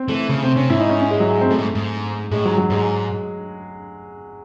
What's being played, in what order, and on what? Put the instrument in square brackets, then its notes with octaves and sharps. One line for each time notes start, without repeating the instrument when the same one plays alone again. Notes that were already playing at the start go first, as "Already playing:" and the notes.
Already playing: [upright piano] C4
[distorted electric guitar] E3 [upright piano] A3
[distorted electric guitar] C#3 [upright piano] A3
[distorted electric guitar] C3 [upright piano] C4
[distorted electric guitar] C3 [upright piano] C#4
[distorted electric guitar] G#2 [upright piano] E4
[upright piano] D#4
C#4
C#4
G#3
F#3
G#3
C4
[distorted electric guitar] A2 [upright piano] A3
[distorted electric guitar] G#2
G#2
[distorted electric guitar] A2 [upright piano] G#3
[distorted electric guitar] G#2 [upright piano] F#3
[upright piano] F#3
[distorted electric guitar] G#2 [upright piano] G#3